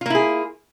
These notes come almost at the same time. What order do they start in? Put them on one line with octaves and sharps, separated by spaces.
F4 A#3 E4 G#4